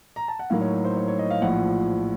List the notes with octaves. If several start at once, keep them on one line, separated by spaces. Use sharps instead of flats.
A#5
A5
F#5
A2 F#3 A#3 D#4 F5
C#5
C#5
C5
C#5
C#5
D#5
F5
A#1 A2 F3 F#5